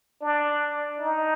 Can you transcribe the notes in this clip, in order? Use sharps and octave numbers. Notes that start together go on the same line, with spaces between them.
D4
D#4